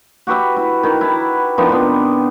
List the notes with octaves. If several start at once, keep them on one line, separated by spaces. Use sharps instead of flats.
F#4 G4 B4 E5
E4
D#3
E4 A5
D#3 F3 B3 D4
C3 B3